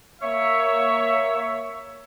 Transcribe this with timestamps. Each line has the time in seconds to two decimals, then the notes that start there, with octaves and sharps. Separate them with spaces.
0.22 A#3 C#5 E5